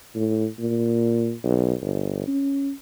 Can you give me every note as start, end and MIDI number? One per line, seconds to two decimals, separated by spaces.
0.15 0.46 45
0.60 1.33 46
1.44 1.73 35
1.81 2.23 31
2.28 2.72 61